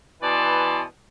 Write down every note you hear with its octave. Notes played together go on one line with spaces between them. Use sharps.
B2 E3 B4 D5 A5 C6